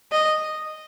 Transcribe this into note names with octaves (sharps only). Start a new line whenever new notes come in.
D#5